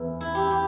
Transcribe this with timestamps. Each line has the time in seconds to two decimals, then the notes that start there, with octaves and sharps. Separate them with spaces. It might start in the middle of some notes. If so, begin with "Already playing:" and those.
Already playing: E2 E3
0.21 E4
0.35 G4
0.51 G4